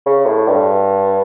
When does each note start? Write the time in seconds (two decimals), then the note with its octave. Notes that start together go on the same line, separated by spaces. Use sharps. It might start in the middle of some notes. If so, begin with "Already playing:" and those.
0.06 C#3
0.26 A2
0.48 G2